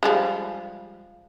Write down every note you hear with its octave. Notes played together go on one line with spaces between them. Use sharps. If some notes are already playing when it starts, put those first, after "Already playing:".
F3 G3 G#3